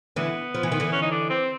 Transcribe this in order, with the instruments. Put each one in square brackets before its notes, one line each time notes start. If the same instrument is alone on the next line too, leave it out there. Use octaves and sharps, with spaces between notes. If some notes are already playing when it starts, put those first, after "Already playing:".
[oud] D3 E3 [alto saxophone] B3
[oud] F3
E3
D#3
D3 E3
[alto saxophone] C#4
D#4
D4
C4